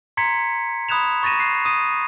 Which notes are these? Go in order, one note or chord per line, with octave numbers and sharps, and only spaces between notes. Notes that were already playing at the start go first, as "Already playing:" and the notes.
A#5 C6 G#6 B6 C#7
B5 D#6 F#6 G#6 E7 F7
C#6 A6 A#6 D#7 E7
F#6 C7 D#7
D#6 D#7